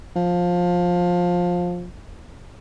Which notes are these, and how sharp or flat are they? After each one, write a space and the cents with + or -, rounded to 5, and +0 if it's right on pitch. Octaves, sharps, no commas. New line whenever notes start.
F3 +15